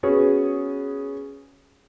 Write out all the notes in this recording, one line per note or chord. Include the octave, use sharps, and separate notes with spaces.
B3 C#4 F#4 G#4 C#5